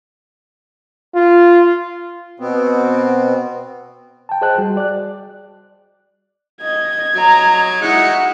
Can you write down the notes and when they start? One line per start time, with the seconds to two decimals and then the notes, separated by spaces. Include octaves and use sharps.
1.15 F4
2.40 B2 B3 C4
4.29 G5 A5
4.42 G#4 C5 D#5 G5 A5 F#6
4.58 G3 F#4 G#4
4.77 D5 F#6
6.62 D#5 G#6
7.15 F#3 D#5 A#5
7.82 G#3 D#4 E4 F#4 F#5 C#7